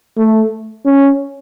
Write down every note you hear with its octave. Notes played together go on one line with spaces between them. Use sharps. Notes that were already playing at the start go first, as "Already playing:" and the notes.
A3
C#4